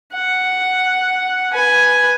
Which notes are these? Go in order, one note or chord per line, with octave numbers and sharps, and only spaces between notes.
F#5
B4 G#5